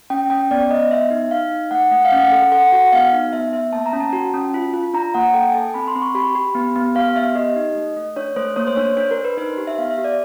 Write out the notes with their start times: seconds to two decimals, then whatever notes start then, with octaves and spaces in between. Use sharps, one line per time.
0.10 C#4 G5
0.30 C#4 G5
0.51 B3 D5
0.70 B3 D#5
0.91 B3 E5
1.11 D#4
1.31 D#4 F5
1.51 D#4
1.71 A3 F#5
1.91 A3 F#5
2.05 F5
2.12 C#4
2.20 F#5
2.32 A4
2.52 A4 F#5
2.72 F#4 F#5
2.92 B3 F5
3.13 D#4
3.33 B3 E5
3.53 B3 E5
3.73 A#3 A5
3.86 A#5
3.93 C#4
4.00 A5
4.13 F#4
4.34 C#4
4.54 F4
4.74 F4
4.94 D4 A#5
5.14 A#3 F#5
5.34 A4 G5
5.49 G#5
5.54 A4 A5
5.74 C4 B5
5.88 C6
5.95 C4
6.02 C#6
6.15 G4 B5
6.35 G4
6.55 B3
6.76 B3
6.95 G4 F5
7.15 B3 E5
7.35 G4 D#5
7.56 D#4
7.76 A3
7.96 A3
8.16 D4 C#5
8.36 A3 C5
8.56 A#3 C#5
8.67 C5
8.76 D4 C#5
8.97 D4 C5
9.11 A#4
9.17 D4
9.25 B4
9.37 D#4 C5
9.58 G4
9.67 E5
9.78 B3 F5
9.91 E5
9.98 G4
10.04 D5